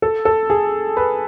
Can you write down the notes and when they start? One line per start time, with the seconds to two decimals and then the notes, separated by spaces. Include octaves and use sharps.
0.02 A4
0.25 A4
0.50 G#4
0.97 B4